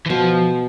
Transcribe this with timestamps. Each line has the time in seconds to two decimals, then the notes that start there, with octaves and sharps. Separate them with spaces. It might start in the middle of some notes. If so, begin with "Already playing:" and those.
0.06 E3
0.10 B2 F3